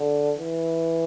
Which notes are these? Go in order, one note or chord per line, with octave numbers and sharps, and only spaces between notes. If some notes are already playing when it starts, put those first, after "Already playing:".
Already playing: D3
E3